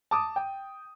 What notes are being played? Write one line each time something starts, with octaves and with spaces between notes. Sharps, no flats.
A5 D6 D#6
G5